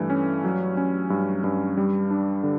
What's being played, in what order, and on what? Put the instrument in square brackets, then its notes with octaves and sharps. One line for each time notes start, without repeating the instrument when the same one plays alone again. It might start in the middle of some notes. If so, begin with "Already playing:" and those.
Already playing: [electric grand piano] G2 E3 A3
C#4
F#3
C#4
G2
G2
G3
D4
D3